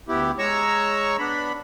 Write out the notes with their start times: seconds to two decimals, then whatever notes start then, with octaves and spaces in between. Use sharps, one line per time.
0.08 D2 B3 E4 G4
0.39 G#3 C#5 A#5 C#6 E6
1.19 B3 D4 B5